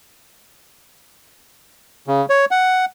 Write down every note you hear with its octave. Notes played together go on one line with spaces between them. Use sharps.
C#3
C#5
F#5